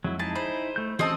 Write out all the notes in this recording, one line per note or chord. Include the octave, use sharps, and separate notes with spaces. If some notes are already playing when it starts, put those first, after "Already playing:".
F2 F#3 G#3 E4
D#4 E4 G#4 A5
C5 B5
A3 G6
E3 C4 C#4 F#4 G#4 D#5 A5 D#6